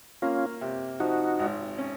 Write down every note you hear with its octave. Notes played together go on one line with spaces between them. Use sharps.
A#3 C#4 F4
C3
F3 D#4 F#4
G#1
C#4